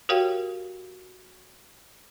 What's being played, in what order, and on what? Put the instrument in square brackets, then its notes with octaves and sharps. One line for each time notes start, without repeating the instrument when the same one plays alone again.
[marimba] F#4 G4 A#4 C#5 F5 G5